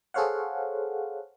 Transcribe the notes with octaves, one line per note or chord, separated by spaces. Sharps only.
G#4 A4 C5 C#5 F5 F#5